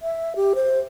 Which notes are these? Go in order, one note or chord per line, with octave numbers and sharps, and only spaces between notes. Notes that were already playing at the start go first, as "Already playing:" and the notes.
E5
G4
C5